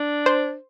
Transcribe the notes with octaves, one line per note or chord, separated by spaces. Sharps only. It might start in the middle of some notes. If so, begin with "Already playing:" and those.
Already playing: D4
C5